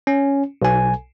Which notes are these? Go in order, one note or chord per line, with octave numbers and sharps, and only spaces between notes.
C#4
B1 G#5